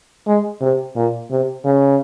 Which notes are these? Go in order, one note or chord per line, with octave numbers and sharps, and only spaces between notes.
G#3
C3
A#2
C3
C#3